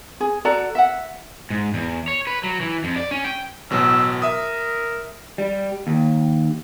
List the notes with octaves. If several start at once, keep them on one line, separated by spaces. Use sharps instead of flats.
G#4
F#4 A4 D5 A#5
E5 F#5
G#2
E2
C#5
B4
F#3
E3
F2
D5
C#4
G5
A1 B2 F#3 E6
A#4 E5 D#6
G3
D#2